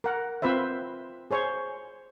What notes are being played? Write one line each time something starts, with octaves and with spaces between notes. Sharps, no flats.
A#4 F#5
C4 F4 B4 C5 E5
G#4 C5 C#5